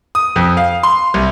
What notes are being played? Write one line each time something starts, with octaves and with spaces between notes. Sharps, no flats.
D#6
F2
F5
C6
C2